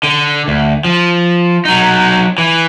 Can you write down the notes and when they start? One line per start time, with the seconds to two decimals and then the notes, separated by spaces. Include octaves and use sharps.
0.03 D3
0.48 D2
0.85 F3
1.65 F#3 D#4
2.38 E3